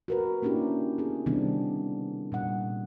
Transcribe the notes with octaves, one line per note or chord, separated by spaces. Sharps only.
F#4 A#4 B4
A#3 C#4 D4 E4 G4
B3 G#4
C3 D#3 G3 B3 C4 D4
A#2 G3 F#5